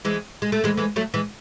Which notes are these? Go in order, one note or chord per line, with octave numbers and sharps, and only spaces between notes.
E3 G#3
G#3
A3
E3 G#3
E3 G#3
F#3 A3
E3 G#3